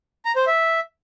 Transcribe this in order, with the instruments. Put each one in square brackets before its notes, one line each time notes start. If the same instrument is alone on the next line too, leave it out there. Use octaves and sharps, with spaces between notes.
[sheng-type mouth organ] A#5
C5
E5